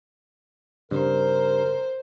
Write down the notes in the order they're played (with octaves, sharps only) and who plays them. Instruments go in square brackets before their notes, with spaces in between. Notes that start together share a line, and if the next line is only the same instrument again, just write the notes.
[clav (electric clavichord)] G2 [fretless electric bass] C#3 C4 C#4 [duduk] A#4 [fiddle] C5